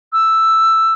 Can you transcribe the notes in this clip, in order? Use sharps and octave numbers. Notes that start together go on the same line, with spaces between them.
E6